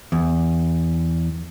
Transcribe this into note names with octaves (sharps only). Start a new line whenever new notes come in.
E2